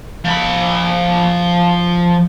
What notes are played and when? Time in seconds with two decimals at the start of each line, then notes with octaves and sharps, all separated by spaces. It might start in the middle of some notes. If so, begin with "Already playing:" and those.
0.24 F3 B5